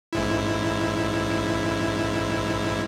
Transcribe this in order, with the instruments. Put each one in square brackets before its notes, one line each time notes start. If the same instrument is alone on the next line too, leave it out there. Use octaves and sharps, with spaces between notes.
[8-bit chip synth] A1 G#2 E4